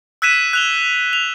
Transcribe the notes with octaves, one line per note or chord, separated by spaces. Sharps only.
E6 F#6 G#6 B6 D#7 E7
F#6 F7 G7
F7